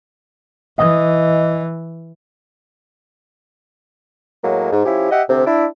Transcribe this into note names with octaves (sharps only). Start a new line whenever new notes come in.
E3 D#5
A2 F#3 G#3 A#3
G#2
F3 C#4 E4 G4
G4 D#5 E5 F#5
D2 C3
D4 E4